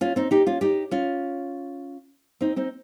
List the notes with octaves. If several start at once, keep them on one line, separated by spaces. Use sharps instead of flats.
C#4 F4
C4 D#4
D#4 G4
C#4 F4
D#4 G4
C#4 F4
C4 D#4
C4 D#4